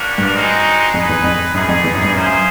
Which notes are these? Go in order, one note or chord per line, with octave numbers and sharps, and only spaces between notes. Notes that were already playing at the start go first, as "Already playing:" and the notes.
Already playing: G3 A#3 D4 F#4 A#4
G2
G#3 C4 D#4 F#4
F2 D#4 G#4 B4
E2
F2
F#2 G3 B3 D#4 G#4
F2
E2
F#2
G2
F#2 C#4 F4 G#4 C5